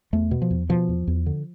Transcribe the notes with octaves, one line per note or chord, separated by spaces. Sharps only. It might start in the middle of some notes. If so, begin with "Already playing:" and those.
E2 A3
B2
F3
E2
B2 F3
E2
E2
D3